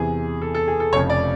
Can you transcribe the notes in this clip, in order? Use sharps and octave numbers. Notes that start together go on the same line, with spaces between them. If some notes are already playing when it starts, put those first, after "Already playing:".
Already playing: E2 C3 E3 G#4
A4
A4
G#4
A4
F1 F2 C#3 C#5
D5